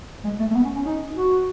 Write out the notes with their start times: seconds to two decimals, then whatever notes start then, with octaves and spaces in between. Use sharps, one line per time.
0.25 G#3
0.39 A3
0.51 A3
0.55 B3
0.64 C#4
0.76 C#4
0.85 D#4
1.16 F#4